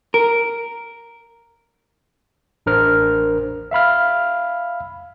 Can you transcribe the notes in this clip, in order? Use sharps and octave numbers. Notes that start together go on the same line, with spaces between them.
A#4
A1 D4 A#4 C5 F6
E5 F5 B5 F6